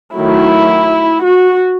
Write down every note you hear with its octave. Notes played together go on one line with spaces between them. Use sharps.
D#3 F#3 A3 E4
F#4